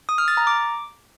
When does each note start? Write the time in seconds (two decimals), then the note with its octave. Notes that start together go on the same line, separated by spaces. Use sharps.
0.09 D#6
0.18 F6
0.28 A6
0.37 A#5
0.47 D6